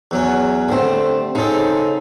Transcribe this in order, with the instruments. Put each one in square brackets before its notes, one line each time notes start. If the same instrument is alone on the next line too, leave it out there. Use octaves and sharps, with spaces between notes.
[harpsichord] E2 F#3 C#4
[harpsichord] D3 A3 [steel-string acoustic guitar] G3 C4
[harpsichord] C#3 C4 [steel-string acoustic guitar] D#4 A4